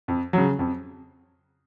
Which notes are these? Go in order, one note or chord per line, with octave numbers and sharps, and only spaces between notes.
F2
C#3 F#3
F2